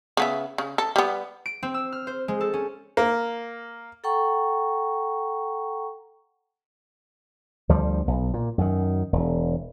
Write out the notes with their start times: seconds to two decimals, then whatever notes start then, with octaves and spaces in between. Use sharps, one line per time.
0.17 C#3 B3 E5
0.58 C#3
0.78 A4
0.96 G3 B3
1.46 D7
1.63 C4
1.74 E6
1.92 F6
2.07 C5
2.28 G#3
2.41 A4
2.53 C#4
2.97 A#3
4.04 A4 F#5 G5 A#5 C#6
7.69 D2 F3 G3
8.08 B1
8.34 A#2
8.58 F#2 D#3
9.13 E1